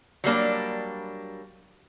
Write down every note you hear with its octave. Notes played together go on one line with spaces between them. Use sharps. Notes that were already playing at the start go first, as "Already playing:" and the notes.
F#3 G3 A#3 D4